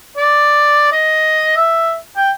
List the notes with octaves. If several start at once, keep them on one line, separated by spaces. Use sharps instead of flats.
D5
D#5
E5
G5